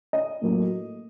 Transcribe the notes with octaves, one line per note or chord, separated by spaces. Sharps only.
D#5
A2 F#3 A#3